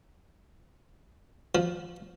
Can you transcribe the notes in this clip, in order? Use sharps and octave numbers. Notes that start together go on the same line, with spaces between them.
F3